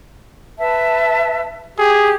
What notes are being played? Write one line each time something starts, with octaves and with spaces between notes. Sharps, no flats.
B4 E5 A5
G4 G#4